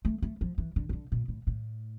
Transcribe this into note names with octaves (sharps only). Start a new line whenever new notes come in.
A3
A3
F3
E3
D3
E3
D3
A#2
A2
A2